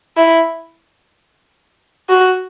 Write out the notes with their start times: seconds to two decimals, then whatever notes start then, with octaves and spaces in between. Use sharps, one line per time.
0.17 E4
2.09 F#4